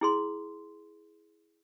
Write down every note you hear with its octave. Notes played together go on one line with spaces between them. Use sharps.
E4 G#4 C6